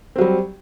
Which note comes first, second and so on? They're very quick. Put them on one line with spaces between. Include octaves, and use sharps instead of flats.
C4 F#3 G3